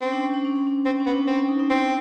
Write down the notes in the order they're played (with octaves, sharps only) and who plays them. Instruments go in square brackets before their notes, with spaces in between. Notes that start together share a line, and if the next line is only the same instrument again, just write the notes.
[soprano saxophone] C4 [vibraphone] C#4
[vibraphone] D4
C#4
D4
C#4
D4
C#4
[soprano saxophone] C4 [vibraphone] C#4
[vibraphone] C#4
[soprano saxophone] B3
[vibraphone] D4
[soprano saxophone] C4 [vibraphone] C#4
[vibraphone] C#4
D#4
D#4
[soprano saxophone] C4 [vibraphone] D4